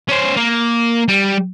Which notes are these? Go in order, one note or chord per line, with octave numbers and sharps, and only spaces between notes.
C#4 C5
A#3
G3